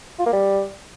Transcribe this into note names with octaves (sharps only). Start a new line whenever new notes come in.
F4
A#3
G3